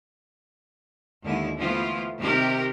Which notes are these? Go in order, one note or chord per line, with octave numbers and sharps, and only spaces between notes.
D#2 D3 G#3 E4
E3 F3 A3 B3 E4 F4
C3 D#3 G4 A#4